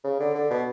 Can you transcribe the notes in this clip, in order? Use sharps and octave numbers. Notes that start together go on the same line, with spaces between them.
C#3
D3
D3
B2